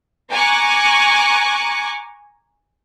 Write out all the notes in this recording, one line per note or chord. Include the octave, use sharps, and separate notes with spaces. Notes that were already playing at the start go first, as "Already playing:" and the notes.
G#5 A#5 C#6 D6 F#6